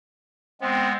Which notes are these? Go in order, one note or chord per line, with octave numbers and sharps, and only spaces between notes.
G#3 B3 C4